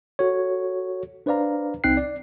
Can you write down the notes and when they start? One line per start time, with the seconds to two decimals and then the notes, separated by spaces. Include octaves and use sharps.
0.19 F#4 A4 C#5
1.26 D4 B4 C5 D5 F5 A#5
1.84 C2 C4 D#4 G5 F#6 C7
1.97 D5